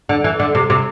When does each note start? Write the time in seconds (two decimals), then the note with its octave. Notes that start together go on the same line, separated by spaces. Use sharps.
0.09 D3
0.24 E3
0.40 D3
0.55 C3
0.70 C3